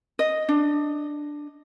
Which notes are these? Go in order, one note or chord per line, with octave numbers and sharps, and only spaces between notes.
D#5
D4